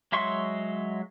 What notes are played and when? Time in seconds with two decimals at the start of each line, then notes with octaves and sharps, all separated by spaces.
0.12 F#3 G#3 E5 C6 C#6